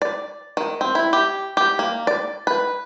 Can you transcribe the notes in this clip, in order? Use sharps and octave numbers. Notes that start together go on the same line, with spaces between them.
D5
D#3
C4
E4
G4
G4
A#3
D5
B4